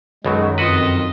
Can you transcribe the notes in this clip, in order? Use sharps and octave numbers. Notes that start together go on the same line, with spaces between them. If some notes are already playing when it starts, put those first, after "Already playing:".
B1 F#2 B2 D#3 F#3 G#3
F2 F4 F#4 B4 D#5